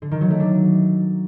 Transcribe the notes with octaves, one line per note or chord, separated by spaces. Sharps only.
D3
D#3
F#3
A3
D4